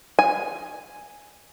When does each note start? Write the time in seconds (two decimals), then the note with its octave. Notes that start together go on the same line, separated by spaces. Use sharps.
0.19 G#5